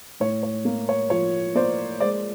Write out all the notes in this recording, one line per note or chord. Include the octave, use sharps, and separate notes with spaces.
A2 C#5
C#5
A#3
C#5
F3 C#5
A#3 C5 D5
G#3 C5 D5